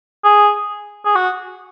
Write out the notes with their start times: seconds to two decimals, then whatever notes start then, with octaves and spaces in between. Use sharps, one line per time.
0.24 G#4
1.05 G#4
1.15 F#4